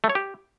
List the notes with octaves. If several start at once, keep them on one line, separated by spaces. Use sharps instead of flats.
A3
C#5
G4